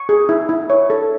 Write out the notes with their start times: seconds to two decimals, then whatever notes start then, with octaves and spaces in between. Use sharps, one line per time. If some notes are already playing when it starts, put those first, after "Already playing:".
Already playing: C#6
0.09 G#4
0.29 E4
0.49 E4
0.70 C#5
0.90 A4